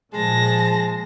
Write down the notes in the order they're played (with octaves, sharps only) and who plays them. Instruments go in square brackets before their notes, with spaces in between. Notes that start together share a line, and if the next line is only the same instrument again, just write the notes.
[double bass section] A#2 F3 [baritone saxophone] G#3 [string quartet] A5 A#6